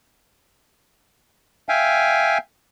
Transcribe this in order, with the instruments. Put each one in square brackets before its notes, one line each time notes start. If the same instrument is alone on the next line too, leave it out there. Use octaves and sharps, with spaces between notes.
[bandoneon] E5 F5 G5 G#5